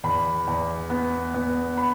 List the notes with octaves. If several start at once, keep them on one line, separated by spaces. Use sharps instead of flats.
E2 B5
E2
B3
B3
B5